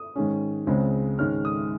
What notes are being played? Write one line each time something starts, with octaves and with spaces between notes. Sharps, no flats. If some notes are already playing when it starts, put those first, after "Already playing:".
Already playing: D#6
G#2 D#3 G#3 C#4
C#2 C#3 G#3 C4
G#2 D#3 G#3 C#4 F6
D#6